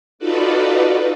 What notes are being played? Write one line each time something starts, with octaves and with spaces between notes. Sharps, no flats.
D#4 F4 F#4 A4 B4 D5